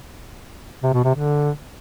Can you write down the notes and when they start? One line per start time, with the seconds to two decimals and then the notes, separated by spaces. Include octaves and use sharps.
0.83 C3
0.94 B2
1.04 C3
1.15 D3